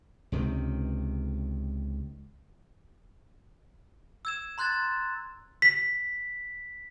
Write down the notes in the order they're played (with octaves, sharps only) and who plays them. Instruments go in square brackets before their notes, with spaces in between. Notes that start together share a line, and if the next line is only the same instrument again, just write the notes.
[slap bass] C#2 C3 D#3
[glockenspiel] E6 G#6 E7
A#5 C6 F#6 G#6 A6
B6